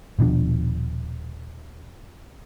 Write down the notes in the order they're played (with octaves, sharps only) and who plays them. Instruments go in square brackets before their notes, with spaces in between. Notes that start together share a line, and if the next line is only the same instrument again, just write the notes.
[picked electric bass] D#1 B2 F3 D4